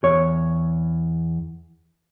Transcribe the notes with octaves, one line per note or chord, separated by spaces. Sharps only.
E2 C#5